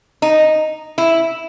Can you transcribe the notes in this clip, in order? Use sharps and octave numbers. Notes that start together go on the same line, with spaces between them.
D#4
E4